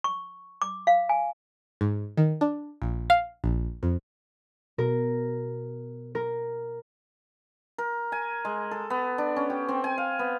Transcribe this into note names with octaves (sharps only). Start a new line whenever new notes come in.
C#6
D6
F5
G#5
G#2
D#3
D4
A#1
F5
A#1
F2
B2 A#4
A#4
A#4
G#5
G#3
A4
B3
D4
C#4
G4
C4
G#5
F5
B3